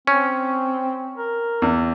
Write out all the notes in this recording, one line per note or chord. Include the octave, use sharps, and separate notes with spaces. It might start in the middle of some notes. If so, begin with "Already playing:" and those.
C4 C#4
A#4
E2